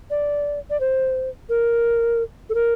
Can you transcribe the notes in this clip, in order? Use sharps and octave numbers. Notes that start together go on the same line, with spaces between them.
D5
D5
C5
A#4
A4
A#4